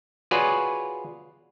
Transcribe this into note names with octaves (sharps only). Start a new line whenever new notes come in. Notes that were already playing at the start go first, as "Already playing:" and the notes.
F4 F#4 G#4 B4 C#5 D5